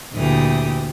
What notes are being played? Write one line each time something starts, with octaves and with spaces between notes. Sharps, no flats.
D2 A#2 E3 A3 G4 D#6